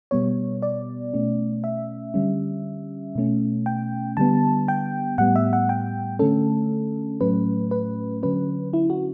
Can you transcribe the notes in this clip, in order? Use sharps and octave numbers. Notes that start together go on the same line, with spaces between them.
B2 G3 B3 C#5
D5
B2 A3 C#4
E5
D3 G3 C#4
B2 A3 C#4
G5
D3 G3 B3 A5
G5
A2 G3 B3 F#5
E5
F#5
G5
D3 A3 C#4 A4
A2 F#3 A3 C#4 B4
B4
D3 F#3 C#4 B4
E4
F#4